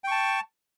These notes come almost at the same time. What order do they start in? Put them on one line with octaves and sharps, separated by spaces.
G5 C#6 A5